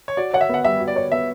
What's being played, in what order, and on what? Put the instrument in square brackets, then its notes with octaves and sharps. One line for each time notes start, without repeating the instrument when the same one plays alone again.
[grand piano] C#5
[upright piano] F#4 [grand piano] D5
[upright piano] C#5 [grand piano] F#5
[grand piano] E5
[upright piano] B3 [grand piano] F#5
[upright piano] G3 [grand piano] E5
[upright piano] F#4
[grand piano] D5
[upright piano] C#5
[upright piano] B3 [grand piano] E5